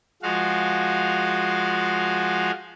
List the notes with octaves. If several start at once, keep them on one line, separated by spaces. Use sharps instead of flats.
F3 G#3 F#4 F5